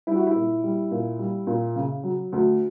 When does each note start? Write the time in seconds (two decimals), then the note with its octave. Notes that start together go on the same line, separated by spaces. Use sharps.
0.07 G3 E4
0.16 F#4
0.27 E4
0.35 A#2
0.63 G3
0.91 A#2
1.19 G3
1.47 A#2
1.76 C#3
2.03 F#3
2.32 D2